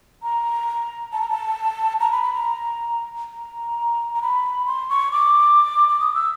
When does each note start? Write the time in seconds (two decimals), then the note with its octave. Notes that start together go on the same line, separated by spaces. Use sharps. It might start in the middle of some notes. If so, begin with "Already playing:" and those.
0.23 A#5
1.13 A5
1.21 A#5
1.30 A5
2.00 A#5
2.12 B5
2.23 B5
2.34 A#5
3.34 A#5
4.14 A#5
4.22 B5
4.66 C6
4.89 C#6
5.12 D6
5.89 D6
6.00 D#6
6.15 E6